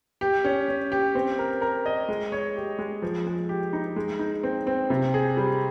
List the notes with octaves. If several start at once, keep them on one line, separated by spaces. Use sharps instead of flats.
G4
C#4
C#4
G4
C4
A#4
A#4
D#5
G#3
C#5
G4
G#3
F3
G#3
G4
D#4
G#3
D#4
C4
C4
C3
G#4
G3